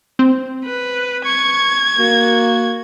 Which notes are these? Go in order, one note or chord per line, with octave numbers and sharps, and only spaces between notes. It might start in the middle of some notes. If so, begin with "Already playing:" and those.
C4
B4
C#6 G#6
A#3 F#4